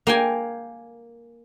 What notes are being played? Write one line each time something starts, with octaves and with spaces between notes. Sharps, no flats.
A#3 G5 G#5